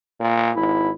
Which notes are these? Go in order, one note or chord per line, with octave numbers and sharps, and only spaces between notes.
A#2
G#1 E4